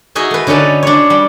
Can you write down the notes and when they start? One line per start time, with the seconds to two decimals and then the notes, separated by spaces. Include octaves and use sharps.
0.15 D#4 F#4 G#4 D#5 E5
0.31 A3 B4
0.47 D3 C#4 D#4 B4 A5
0.83 D4 C#5
1.10 G3